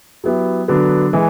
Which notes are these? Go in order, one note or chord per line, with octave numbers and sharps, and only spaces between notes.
F#3 B3 E4 G4
D3 F#3 B3 D4
E3 G#3